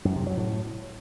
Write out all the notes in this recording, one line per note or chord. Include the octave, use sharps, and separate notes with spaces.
F#2
C3
F#3
A2